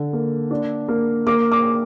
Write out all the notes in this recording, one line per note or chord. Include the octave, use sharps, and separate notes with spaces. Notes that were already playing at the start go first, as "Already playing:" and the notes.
Already playing: D3
A#3
D4
A#3
A#3 D6
D6